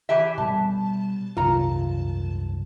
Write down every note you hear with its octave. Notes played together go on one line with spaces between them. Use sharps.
E3 G4 E5
B2 G3 A5
C2 F#2 F4 A#5